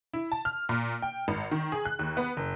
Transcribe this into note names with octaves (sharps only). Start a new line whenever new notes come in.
E4
A5
F6
A#2
G5
G#1
D#3
G#4
F#6
D#2
B3
F#1